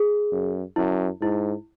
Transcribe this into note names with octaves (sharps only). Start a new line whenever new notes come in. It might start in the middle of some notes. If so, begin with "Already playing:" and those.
Already playing: G#4
F#2
F#2 E4
G#2 E4